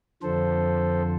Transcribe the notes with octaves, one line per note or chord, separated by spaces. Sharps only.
F2 D3 F3 A4 C5